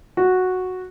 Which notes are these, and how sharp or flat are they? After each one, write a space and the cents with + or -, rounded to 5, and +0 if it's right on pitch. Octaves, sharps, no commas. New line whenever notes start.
F#4 -5